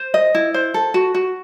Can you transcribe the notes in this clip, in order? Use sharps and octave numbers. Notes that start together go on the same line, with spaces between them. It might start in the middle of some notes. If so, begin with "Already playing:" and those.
Already playing: C5
D#5
E4
C5
A4
F#4
F#4